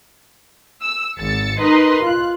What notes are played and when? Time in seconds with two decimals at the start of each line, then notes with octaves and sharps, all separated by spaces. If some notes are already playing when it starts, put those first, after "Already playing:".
0.82 E6
1.18 G#1 E6 A6 C#7
1.59 D#4 A#4 B4 D#5 C6
2.03 F4 F#6